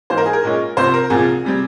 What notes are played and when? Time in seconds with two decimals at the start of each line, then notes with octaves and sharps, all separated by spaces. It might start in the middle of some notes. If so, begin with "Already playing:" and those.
0.10 G#2 E3 A#3 C5
0.18 A#4
0.26 G#4
0.33 A#4
0.44 A#2 G#3 C#4
0.77 C2 C3 F3 C4 C5
0.94 A#4
1.10 C2 A#2 F3 G#4
1.45 C3 G3 C4